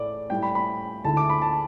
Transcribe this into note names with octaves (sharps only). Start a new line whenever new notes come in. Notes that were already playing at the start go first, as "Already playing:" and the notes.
Already playing: A2 A3 E4 D5
A2 G3 E4 G5
B5
B5
D2 D3 A3 E4 A5
D6
B5
A5